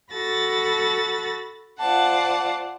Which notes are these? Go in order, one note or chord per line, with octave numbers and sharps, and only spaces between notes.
F#4 A4 B5 A6 A#6
F4 C5 D5 F#5 A5